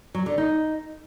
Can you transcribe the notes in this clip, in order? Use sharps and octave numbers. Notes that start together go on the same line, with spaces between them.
F#3
D3
D#4